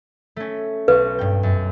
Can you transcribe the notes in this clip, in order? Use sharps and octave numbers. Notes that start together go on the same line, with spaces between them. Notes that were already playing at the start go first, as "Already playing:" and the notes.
A3 C#4
B1 B4 C#6
G2 G5
F#2